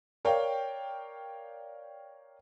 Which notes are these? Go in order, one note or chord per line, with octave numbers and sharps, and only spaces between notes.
A#4 C#5 D5 F5 G5